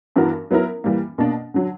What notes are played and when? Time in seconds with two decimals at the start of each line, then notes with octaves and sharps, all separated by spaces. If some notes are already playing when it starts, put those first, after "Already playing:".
0.16 G2 E3 B3 F#4 A#4
0.51 F#3 B3 E4 A#4
0.84 E3 G3 A#3
1.18 B2 A#3 D4
1.54 D3 F#3